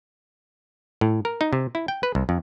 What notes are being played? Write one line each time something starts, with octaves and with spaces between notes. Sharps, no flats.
A2
A#4
D#4
C3
E4
G5
B4
C2
F2